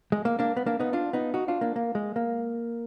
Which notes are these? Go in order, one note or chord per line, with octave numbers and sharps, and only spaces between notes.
G#3
A#3
A#3 D4
B3
A#3 D4
B3 D#4
D4 F4
B3 D#4
D#4 F#4
D4 F4
A#3 D4
A#3
G#3
A#3